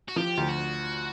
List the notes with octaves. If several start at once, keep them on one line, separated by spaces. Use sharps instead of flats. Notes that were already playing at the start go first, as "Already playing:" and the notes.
F#4
F3 G4
D2
F#4